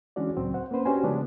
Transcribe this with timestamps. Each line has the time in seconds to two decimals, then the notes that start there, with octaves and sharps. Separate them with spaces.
0.16 E3 G#3 C#4 D4 F#4 D5
0.37 C#2 A2 F#3 C4
0.54 C5 F#5
0.71 A#3 C4 C#4 B4 C5
0.85 C#4 D4 F#4 G4 C5 G#5
1.04 C#3 F3 G#3 A3 B3 D4